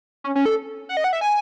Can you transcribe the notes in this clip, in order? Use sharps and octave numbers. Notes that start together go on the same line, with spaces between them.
C#4
C#4
A4
F#5
D#5
F#5
E5
G#5